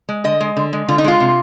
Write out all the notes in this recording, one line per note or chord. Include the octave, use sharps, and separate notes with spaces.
G#3
D3 D#5
G#3
D3
G#3
D3 F4
D#4
G#3 F4
C3